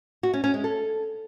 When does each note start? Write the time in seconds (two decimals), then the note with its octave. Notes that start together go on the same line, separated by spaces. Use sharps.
0.23 F#4
0.34 C#4
0.44 C#4
0.54 G#3
0.64 A4